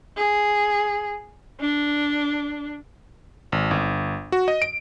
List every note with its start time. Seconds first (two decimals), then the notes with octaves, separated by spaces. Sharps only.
0.17 G#4
1.60 D4
3.52 G#1
3.71 G1
4.32 F#4
4.48 D#5
4.62 D7